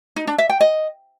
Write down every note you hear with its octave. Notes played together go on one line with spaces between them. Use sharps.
D#4
D4
E5
G5
D#5